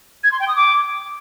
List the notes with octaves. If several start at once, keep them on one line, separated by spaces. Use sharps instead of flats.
G#6
C6
G5
D#6
D6